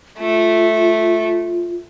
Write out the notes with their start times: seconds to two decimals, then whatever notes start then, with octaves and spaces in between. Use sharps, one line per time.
0.19 A3 F4